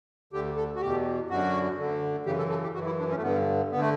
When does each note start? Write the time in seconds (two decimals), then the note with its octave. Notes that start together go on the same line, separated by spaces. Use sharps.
0.33 D2 D3 G4
0.56 A4
0.76 F#4
0.81 E2 B2 G4
1.29 F#2 D3 F#4
1.78 D2 D3
2.26 F#2 C#3 E3 G4
2.39 A4
2.50 A4
2.63 G4
2.74 F#2 E3 F#4
2.86 E4
2.99 D4
3.11 C#4
3.17 A3
3.23 G2 D3 B3
3.72 D3 B3
3.80 A3